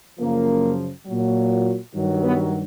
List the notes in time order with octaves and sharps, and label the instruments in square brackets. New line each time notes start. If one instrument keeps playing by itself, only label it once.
[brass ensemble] F#2 C#3 F3 A#3
A#2 F#3
G2 D#3 F#3
B3